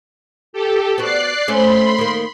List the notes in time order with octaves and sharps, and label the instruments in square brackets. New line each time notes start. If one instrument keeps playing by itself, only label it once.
[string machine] G4 A4
[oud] B3 F#4 [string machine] D5 F#6 C7
[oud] A3 C4 C#4 [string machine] B5 C6
[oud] D#3 A#3